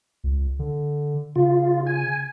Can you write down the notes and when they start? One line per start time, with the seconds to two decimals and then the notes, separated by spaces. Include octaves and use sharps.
0.24 C#2
0.59 D3
1.36 C#3 F4
1.87 G#5